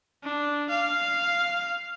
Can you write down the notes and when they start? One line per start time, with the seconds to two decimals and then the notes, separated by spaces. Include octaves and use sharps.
0.24 D4
0.69 F5